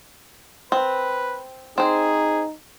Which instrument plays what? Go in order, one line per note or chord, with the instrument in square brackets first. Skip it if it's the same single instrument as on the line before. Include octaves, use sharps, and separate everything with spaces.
[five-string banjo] C4 [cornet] B4
[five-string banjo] C4 C5 [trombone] D#4 [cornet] G#4